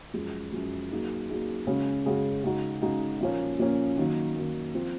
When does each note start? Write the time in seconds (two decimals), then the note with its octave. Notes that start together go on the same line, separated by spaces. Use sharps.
0.14 F#2 F3 G#3
0.52 F#2 F3 G#3
0.91 F#3 A#3 D#4 G#4
1.29 F#3 A#3 D#4 G#4
1.67 C#3 G#3 C#4 F#4
2.06 C#3 G#3 C#4 F#4
2.43 C#3 G#3 D#4 F#4
2.82 C#3 G#3 D#4 F#4
3.20 A#2 F3 A#3 C#4
3.59 A#2 F3 A#3 C#4
3.98 D#3 F#3 A#3
4.36 D#3 F#3 A#3
4.75 F3 C4